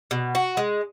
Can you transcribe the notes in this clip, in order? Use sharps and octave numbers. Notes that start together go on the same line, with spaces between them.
B2
F#4
G#3